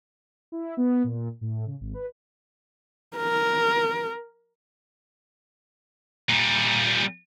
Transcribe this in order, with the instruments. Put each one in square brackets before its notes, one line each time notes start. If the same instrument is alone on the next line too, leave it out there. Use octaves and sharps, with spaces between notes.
[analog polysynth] E4
B3
A#2
A2
C#3
G#1
B4
[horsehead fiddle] A#4
[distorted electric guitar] A#2 G3